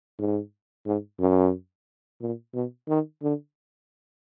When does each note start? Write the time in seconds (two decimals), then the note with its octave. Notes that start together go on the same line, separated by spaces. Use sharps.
0.19 G#2
0.86 G#2
1.20 F#2
2.22 A#2
2.54 B2
2.89 D#3
3.23 D3